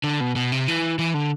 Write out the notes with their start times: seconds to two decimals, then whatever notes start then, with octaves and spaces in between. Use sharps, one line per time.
0.04 D3
0.20 B2
0.36 B2
0.52 C3
0.68 E3
0.99 E3
1.14 D3